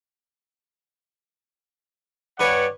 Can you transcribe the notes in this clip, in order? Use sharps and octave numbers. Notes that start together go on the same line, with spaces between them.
G2 B4 C#5 D5 F#5 G#5